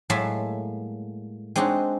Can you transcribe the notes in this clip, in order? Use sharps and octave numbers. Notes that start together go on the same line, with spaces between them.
A2 F#3 G#3 A#3 E5 A5
G#3 C4 D4 D#4 F#4